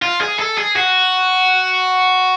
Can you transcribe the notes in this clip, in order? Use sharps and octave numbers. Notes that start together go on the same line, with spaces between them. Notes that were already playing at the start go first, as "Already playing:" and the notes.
F4
G#4
A4
G#4
F#4